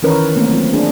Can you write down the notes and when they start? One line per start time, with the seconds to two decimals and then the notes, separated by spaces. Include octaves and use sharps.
0.03 D#3 E3 C#4 A#4 B4 C#5
0.36 A3 A#3 C4
0.50 F#3 A#3 C4 F4
0.73 D4 G#4